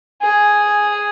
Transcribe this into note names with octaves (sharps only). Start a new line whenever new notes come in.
G#4